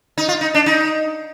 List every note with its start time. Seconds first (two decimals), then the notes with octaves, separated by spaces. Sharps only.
0.18 D#4
0.28 F4
0.41 D#4
0.54 D4
0.66 D#4